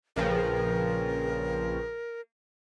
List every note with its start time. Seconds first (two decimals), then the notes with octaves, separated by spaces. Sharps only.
0.16 A#1 C#3 F3 G#4 A#4 B4 G5